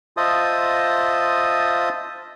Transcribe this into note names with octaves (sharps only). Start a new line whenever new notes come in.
F4 C5 D#5 E5 A5 D#6